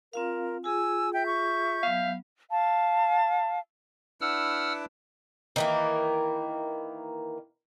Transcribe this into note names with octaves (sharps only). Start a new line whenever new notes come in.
C4 F4 A#4 F5
F4 G#4 G#5 E6
E5 G5 G6
C#6
F#3 B3 F5
F5 A5
D4 E4 B4 F#5 E6 F6
D#3 E3 A#3